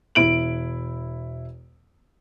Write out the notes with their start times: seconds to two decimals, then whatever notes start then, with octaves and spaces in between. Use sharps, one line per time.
0.15 E1 E4 D7 F#7